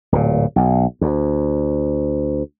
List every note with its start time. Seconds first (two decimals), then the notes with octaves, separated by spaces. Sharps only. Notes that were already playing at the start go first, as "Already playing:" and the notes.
0.12 D1 A#2
0.56 B1
1.01 D2